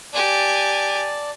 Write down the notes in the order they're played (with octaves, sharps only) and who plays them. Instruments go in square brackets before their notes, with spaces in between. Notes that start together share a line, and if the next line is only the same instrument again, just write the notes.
[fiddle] G4 G#5 [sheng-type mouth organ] D5 A5